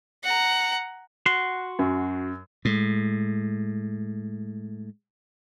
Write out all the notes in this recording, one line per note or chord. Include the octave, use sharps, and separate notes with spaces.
F#5 A#5
F#4 F#5 C6
F#2
A2 G#3